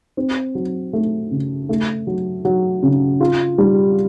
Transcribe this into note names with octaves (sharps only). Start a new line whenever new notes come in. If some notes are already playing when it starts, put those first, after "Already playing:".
C4
F#3
A3
C#3
A3
F#3
F#3
C#3
F4
G3